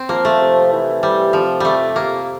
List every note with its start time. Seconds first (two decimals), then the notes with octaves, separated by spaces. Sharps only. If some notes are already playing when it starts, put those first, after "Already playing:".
Already playing: C4
0.09 F3 A#3
0.25 A3
0.41 C3
0.71 E3
1.03 C3 G3
1.33 C3 F3
1.60 F2 G3 A3
1.96 C3 A#3